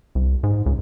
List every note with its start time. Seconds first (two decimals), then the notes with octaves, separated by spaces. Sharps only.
0.15 C2
0.43 G#2
0.66 C#2